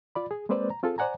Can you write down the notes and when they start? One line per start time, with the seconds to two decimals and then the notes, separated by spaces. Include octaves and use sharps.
0.15 F4 D5 B5
0.31 G#4
0.49 G#3 A#3 C4 B4 C5 D5
0.70 A#5
0.83 C4 F4 G#4 A4
0.98 C5 D5 F#5 G#5 A#5